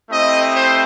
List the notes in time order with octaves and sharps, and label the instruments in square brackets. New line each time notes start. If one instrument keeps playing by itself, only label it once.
[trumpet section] A3 C4 E4 G4 D#5
C5